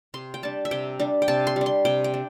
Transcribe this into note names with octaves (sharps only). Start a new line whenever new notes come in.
C3 C6
G5
G3 D4 A5
E5
C3 G5
G3 D4
G5
C3 A5
C6
G3 D4
C6
C3 G5
G5
D4